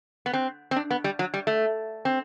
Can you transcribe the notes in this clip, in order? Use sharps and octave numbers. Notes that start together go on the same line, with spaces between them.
B3
C4
C4
D4
B3
G3
F#3
G3
A3
C4